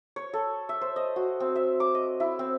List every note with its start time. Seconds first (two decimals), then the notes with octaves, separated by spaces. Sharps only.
0.16 C#5
0.33 A4
0.69 E5
0.81 C5
0.96 D#5
1.16 F#4
1.40 C4
1.56 E5
1.80 D6
1.95 D#5
2.20 E4
2.39 C4